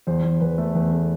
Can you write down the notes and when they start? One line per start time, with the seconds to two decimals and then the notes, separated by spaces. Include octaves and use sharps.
0.07 E2 C5
0.24 E2
0.41 E2 B4
0.58 A3
0.75 E2 B4
0.92 A3 A4